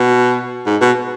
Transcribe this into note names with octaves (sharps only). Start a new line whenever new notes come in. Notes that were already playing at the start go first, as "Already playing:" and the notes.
Already playing: B2
G#2
B2